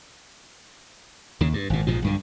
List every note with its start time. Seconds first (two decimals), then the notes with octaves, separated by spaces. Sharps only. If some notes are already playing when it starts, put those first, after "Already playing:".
1.41 D#2 C#3
1.54 G2
1.70 G#1 A#2
1.87 A#1 G#2 B2 F3
2.02 B1 G2 D3